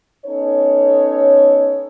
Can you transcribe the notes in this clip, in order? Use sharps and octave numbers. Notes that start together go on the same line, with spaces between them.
B3 C#4 D#4 A4 C#5